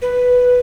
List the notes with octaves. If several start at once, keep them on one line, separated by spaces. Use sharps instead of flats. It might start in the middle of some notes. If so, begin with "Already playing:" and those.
B4